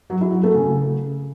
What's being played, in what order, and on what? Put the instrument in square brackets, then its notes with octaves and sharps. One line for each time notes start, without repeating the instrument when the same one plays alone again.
[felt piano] F#3
E4
F#3
A3
C#3